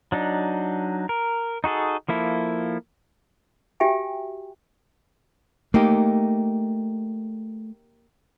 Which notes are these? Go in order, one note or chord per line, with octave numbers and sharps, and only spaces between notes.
F#3 D4 D#4
A#4
D#4 F#4 G#4 A4
F3 A#3 E4 A4
F#4 G4 E5 G5 G#5
A3 A#3 D#4 G4